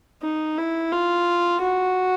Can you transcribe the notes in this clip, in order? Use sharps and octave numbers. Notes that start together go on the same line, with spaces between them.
D#4
E4
F4
F#4